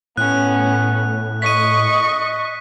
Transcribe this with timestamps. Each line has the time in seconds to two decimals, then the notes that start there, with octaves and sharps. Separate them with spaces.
0.17 A2 B3 C#4 F#6
1.42 D#5 C#6 B6 D#7